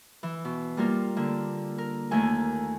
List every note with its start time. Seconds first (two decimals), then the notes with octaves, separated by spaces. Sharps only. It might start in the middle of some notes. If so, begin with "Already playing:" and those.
0.23 E3
0.45 B2
0.77 G3 A#3 F4 A#4
1.17 D3 A#3
1.78 A#4
2.11 D#2 A3 A#3 G#5